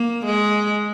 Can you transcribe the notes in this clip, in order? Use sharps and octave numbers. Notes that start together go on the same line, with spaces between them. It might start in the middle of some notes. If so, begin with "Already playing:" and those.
Already playing: A#3
G#3